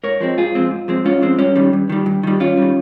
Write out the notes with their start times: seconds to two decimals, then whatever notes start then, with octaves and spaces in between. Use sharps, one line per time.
0.03 G#2 A#4 C#5
0.21 F3 G#3 C4
0.38 G#2 F4 G#4
0.55 F3 G#3 C4
0.71 G#2
0.88 F3 G#3 C4
1.05 G#2 C#4 F4
1.22 F3 G#3 C4
1.39 G2 C#4
1.56 D#3 G3
1.73 G2
1.89 D#3 G3
2.06 G2
2.23 D#3 G3
2.40 G2 C#4 F4
2.57 D#3 G3